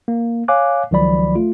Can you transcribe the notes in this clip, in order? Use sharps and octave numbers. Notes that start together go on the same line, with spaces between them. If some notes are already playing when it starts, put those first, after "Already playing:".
A#3
C#5 F5 G#5 D6 F#6
C#2 D#3 F3 F#3 D5 B5
A3 F4